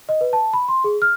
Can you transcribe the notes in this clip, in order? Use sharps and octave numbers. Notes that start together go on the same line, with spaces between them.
D#5
B4
A5
B5
C6
G#4
F6